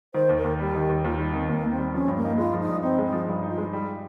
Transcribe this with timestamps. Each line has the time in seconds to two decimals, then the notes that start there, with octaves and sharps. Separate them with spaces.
0.14 D#3 C5
0.29 D#2
0.37 A#4
0.44 D#2
0.59 G3 G4
0.75 D#3
0.89 D#2
1.04 D#2 F4
1.18 G3 D#4
1.33 D#3 C4
1.49 D#2 A#3
1.63 D#2
1.71 C4
1.78 G3
1.94 F3 C#4
2.08 G2
2.17 A#3
2.24 D#4
2.38 G#3 F4
2.53 F3
2.61 D#4
2.69 G2
2.83 C4 D#4
2.99 G#3
3.06 D#4
3.12 F3
3.28 G2
3.43 D#4
3.50 F4
3.58 G#3
3.73 G3 D#4